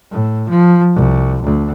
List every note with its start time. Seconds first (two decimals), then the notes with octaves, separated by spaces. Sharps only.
0.11 A2
0.49 F3
0.95 C2
1.42 D2